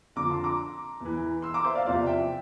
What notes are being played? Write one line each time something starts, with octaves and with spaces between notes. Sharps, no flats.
F2 D3 F3 A#5 D6
A5 C6
A#5 D6
E2 E3
C6 E6
A#5 D6
C5 E5
D5 F5
E2 C3 F3 D5 F5
E5 G5